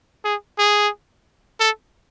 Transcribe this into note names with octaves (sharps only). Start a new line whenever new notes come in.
G#4
G#4
A4